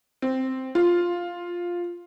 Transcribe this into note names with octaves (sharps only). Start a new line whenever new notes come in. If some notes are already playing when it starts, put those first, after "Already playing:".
C4
F4